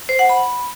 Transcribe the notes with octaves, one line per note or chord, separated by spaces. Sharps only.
C5
F#5
B5